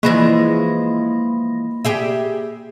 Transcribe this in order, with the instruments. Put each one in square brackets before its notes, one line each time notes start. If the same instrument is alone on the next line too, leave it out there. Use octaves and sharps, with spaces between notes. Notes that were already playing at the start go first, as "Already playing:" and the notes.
[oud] E3 F3 G#3 [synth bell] A#3 B5 A#6
[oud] G4 G#4 E5